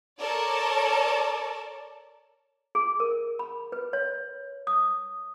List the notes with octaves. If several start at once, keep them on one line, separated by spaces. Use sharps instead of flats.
A4 A#4 C#5 D5 A5
G#4
A#4
B5
B4
C#5
D#6